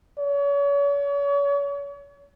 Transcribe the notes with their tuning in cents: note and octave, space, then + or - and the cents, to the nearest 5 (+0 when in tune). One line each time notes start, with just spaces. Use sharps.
C#5 +40